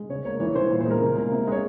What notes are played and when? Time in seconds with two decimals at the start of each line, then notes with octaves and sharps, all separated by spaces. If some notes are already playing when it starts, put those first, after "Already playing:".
Already playing: G#3
0.09 C#3 C#5
0.25 A#3 C#5
0.40 E3 C#5
0.55 E3 C5
0.71 A#2
0.81 C5
0.86 G#3 A#4
1.01 C#3
1.17 A#3
1.32 C3
1.48 G#3 C#5